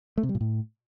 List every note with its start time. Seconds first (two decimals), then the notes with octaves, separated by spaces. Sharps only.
0.18 A3
0.23 C3
0.29 G3
0.35 A#2
0.41 A2